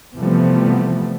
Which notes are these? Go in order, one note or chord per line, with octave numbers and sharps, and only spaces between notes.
C3 E3 F3 G3 A3 B3